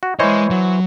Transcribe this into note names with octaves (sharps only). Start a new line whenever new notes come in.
F#4
E3 G#3 C5 C#5 D#5
F#3